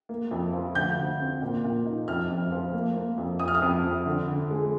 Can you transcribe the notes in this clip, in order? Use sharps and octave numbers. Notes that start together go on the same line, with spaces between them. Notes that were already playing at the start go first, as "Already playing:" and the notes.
A#3
F2
F3
D2 G6
D2
C4
A#2
A#2
D#4
F2 F6
F2
F3
A#3
A#3
F2
F2 D#6
F6
D#6
F2
F2
D3
D3
G#3